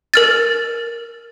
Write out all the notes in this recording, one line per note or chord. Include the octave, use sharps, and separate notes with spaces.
A#4 F6 A6